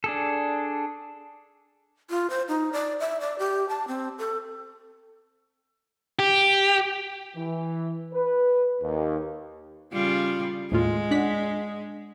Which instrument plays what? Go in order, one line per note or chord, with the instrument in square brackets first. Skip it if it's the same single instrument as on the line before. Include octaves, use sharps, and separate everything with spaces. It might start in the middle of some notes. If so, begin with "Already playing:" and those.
[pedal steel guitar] D4 G#4 A4
[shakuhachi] F4
C5
D#4
D5
E5
D5
G4
A5
C4
A4
[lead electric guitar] G4
[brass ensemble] E3
B4
D#2
[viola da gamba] C#3 G3 F4
[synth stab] D#2 A2 F4 [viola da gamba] G#3
[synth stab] D4 F#5 B6